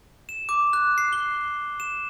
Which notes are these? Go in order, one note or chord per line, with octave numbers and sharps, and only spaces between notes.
E7
D6
F#6
C7
G7
E7